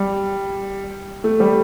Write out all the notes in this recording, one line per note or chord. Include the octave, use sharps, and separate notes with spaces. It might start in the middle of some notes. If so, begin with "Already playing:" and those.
Already playing: G3
A3
G3